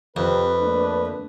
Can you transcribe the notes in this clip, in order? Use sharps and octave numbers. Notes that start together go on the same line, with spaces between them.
F2 C3 B4
A3 A#3 D4